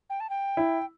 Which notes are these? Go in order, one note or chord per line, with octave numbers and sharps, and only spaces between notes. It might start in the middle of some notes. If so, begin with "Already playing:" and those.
G5
A5
G5
E4